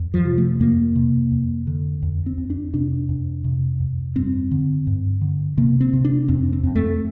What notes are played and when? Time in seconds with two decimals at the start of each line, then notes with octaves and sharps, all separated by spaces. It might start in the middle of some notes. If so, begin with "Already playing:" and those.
Already playing: F2
0.14 F3
0.25 C3
0.38 A3
0.60 F2 A#3
0.96 C3
1.32 F2
1.67 D3
2.02 F2
2.26 C4
2.38 F2
2.50 D4
2.74 C3 D4
3.09 F2
3.44 C3
3.80 F2
4.15 G2 C4
4.51 D3
4.87 G2
5.21 D3
5.57 C3 A#3
5.80 C4
5.93 C3
6.05 D4
6.28 F2 C4
6.53 C4
6.64 F2
6.75 A3